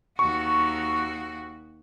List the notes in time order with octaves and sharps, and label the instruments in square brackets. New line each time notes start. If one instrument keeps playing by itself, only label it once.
[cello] D#2 F#4 [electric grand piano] C#6